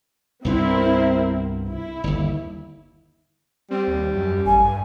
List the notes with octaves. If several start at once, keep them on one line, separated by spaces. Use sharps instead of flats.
C2 G2 B3 C4 E4 A#4
E4
G1 D#2
G3 C4
D#2
F#2
A1 G#5
G2